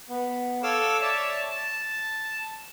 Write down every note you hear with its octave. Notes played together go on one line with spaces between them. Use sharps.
B3
A4 C#5 F5 D6 E6
C#5 D5 E5 A5
A5